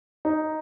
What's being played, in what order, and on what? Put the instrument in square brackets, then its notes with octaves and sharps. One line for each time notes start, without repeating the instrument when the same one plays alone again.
[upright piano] D#4